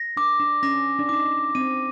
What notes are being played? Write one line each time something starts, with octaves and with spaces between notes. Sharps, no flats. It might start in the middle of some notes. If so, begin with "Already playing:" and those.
Already playing: A#6
D4 D6
D4
C#4 A#6
D4
D#4 D6
C4 D#7